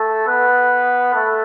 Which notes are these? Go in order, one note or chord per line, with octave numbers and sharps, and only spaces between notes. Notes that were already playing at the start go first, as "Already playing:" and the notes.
Already playing: A3 A4
B3 B4
A3 A4